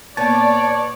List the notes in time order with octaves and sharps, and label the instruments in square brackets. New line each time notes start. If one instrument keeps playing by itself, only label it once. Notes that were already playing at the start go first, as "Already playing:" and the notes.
[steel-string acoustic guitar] A#2 B3 [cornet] C#5 [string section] D5 [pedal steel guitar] A5